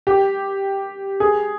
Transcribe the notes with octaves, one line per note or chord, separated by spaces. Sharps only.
G4
G#4